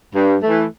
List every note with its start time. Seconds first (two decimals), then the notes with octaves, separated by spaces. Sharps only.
0.14 G2
0.43 E3 A3